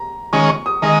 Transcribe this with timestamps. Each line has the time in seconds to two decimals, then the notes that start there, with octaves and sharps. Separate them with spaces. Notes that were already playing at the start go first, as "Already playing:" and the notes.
Already playing: A#5
0.33 D#3 G#3 C#4 C#6
0.50 C#6
0.66 D#6
0.82 D#3 G#3 D#5